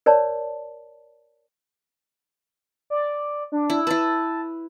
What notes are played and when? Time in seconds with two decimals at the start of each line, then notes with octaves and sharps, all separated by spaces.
0.06 A#4 C#5 D5 A5
2.90 D5
3.52 D4
3.70 E4
3.87 E4 B4 A5